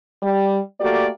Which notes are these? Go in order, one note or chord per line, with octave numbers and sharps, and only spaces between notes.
G3
A3 A#3 F#4 G4 A4 D5